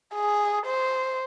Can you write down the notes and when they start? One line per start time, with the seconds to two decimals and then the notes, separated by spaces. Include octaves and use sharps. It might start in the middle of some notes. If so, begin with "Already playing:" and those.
0.16 G#4
0.66 C5